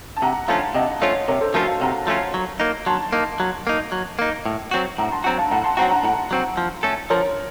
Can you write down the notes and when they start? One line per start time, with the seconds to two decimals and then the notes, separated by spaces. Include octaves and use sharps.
0.17 A5
0.22 C3 F#5 A#5
0.48 F3 A3 C#4 F4 F5 A5
0.74 C3 D#5 F#5
1.01 F3 A3 C#4 F4 C#5 F5
1.28 C3 A#4 C#5
1.41 A4 C5
1.54 F3 A3 C#4 F4 F#4 A#4
1.68 F5 A5
1.81 C3 F#5 A#5
2.07 F3 A3 C#4 F4
2.34 F#3
2.60 A#3 D#4
2.86 F#3 A5 C6
3.13 A#3 D#4
3.40 F#3
3.67 A#3 D#4
3.92 F#3
4.19 A#3 D#4
4.46 A2
4.71 F#3 C4 F#4
4.98 A2 F#5 A#5
5.12 A5 C6
5.24 F#3 C4 F#4 F#5 A#5
5.38 F5 A5
5.51 A2 F#5 A#5
5.64 A5 C6
5.77 F#3 C4 F#4 F#5 A#5
5.91 F#5 A#5
6.04 A2 F#5 A#5
6.31 F#3 C4 F#4
6.57 F3
6.83 A3 C#4 A4
7.10 F3 A#4 C#5